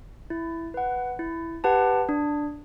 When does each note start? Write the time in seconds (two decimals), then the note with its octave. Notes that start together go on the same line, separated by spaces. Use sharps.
0.30 E4
0.74 B4 F#5
1.19 E4
1.64 G4 B4 F#5 A5
2.09 D4